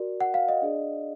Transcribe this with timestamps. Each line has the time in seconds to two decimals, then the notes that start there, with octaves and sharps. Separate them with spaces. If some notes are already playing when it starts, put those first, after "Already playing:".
Already playing: F#4 A#4 D5
0.21 F#5
0.34 F5
0.49 D#5
0.62 D4 G#4 D5